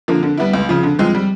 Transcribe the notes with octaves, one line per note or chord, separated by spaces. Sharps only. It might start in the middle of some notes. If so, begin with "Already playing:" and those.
D3 F3 A#3
D3
G3 B3 E4
C#2
C#3 F3
D3
F3 G#3 C4
G3